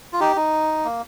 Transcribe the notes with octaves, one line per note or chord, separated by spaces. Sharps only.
F4
D#4 G4
D#4
A#3